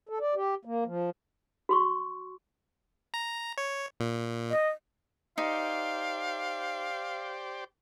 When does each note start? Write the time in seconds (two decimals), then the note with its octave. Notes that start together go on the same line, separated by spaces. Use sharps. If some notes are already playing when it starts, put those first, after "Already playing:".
0.09 A4
0.21 D5
0.35 G4
0.65 A#3
0.86 F3
1.69 F#4 C6 C#6
3.14 A#5
3.58 C#5
4.00 A#2
4.51 D#5
5.38 D#4 G4 C5 D5 F5